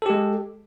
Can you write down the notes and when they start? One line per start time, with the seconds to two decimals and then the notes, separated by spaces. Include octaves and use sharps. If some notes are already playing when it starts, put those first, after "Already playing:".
0.02 A4
0.06 G4
0.10 G#3